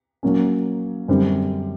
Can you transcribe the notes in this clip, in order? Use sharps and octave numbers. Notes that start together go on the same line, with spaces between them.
F#3 A#3 C#4
F#2 D3 G3 C4